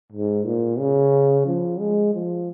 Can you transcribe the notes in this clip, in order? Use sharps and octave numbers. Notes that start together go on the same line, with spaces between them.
G#2
A#2
C#3
F3
G#3
F3